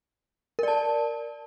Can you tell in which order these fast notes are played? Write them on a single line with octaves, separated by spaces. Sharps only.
A#4 D5 A5